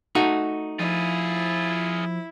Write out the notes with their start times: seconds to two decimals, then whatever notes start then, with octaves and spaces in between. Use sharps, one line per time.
0.15 A3 D#4 F#4
0.79 F3 E4 F4 G#4